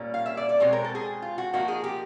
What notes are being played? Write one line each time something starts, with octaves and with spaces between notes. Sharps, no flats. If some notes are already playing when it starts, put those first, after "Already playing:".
Already playing: A#2 G3 A#3 C#4
F5
E5
D5
D5
B2 G#3 C4 C#5
A#4
A4
G#4
F4
F#4
F3 A#3 D#4 F#4
G#4
G4